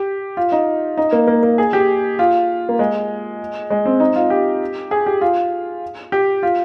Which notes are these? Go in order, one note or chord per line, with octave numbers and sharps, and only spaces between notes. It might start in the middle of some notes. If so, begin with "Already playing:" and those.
Already playing: G4
F4
D#4
D#4
A#3
A#3
A#3
G#4
G4
F4
A#3
G#3
G#3
C4
D#4
F4
G4
G#4
G4
F4
G4
F4